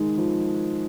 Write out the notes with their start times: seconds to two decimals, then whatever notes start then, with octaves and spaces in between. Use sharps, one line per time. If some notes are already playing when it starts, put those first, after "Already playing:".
Already playing: D#3 G#3
0.18 F3